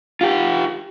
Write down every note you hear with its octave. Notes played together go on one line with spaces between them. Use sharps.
F4 G4